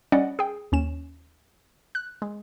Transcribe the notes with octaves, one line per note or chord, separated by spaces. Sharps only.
G3 C#4 D5 D#5 F#5
G#4 G5
D#2 C#4 E7
F#6
G#3